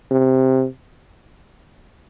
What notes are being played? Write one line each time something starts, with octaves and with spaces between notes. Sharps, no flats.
C3